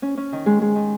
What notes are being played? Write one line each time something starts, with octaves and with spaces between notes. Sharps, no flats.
C#4
C#4
D#3
G#3
G#3
D#3